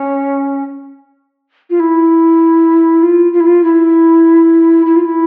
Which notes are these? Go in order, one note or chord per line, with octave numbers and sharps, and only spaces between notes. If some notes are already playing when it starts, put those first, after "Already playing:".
Already playing: C#4
F4
E4
F4
F4
E4
F4
E4
E4
F4
E4